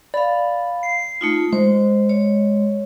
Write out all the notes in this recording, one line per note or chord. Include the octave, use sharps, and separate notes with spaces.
D5 F5 B5
C7
A3 D#4 F4
G#3 C5
C#5